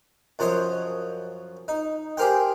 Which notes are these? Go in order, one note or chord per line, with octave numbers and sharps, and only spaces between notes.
F#2 F3 C5 C#5 D#5 D#6
D#4
G4 G#4 A#4 C5 G5